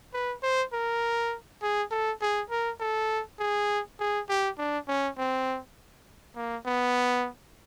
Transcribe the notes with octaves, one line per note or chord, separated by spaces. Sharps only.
B4
C5
A#4
G#4
A4
G#4
A#4
A4
G#4
G#4
G4
D4
C#4
C4
A#3
B3